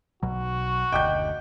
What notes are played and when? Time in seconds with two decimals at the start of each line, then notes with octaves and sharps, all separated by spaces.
0.23 B1 B2 F#3 F#4
0.92 F#1 D2 D#5 G5 D6 G6